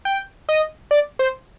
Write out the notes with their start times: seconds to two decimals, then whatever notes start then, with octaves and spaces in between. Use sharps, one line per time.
0.05 G5
0.49 D#5
0.91 D5
1.19 C5